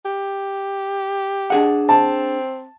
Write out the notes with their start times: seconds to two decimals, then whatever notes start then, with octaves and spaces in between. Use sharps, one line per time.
0.05 G4
1.50 D4 G#4 F#5
1.89 C4 A5